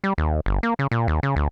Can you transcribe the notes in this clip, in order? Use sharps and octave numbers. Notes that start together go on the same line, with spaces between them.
G3
D#2
G1
A#3
C#3
A#2
D#2
C#3
D2